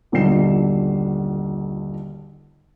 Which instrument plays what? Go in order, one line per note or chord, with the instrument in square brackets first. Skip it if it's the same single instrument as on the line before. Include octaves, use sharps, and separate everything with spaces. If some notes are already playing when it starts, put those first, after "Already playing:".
[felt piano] D#1 B1 D3 F4 C7 E7